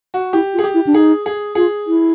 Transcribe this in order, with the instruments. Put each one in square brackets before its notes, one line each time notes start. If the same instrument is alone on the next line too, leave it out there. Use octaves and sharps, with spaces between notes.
[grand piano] F#4
[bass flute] E4 [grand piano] G4
[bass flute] F4
[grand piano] G#4
G4
[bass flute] E4
D4
[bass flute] D#4 [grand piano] G#4
[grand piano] G#4
[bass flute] F4 [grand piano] G#4
[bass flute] E4